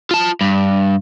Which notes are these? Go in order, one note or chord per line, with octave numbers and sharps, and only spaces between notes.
F4 A5
G2